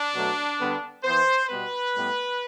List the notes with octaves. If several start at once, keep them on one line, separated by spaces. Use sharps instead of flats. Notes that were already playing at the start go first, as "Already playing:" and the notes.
Already playing: D4
B2 F#3 A3
D3 G3 B3
E3 B3 C5
B2 G3 B3 B4
A2 G3 B3